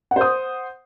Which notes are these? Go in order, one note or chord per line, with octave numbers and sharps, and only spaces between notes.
C5 F#5 D#6